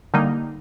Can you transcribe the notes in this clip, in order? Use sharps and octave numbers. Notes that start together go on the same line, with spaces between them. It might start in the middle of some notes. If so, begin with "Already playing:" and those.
D3 G3 A#3 D#4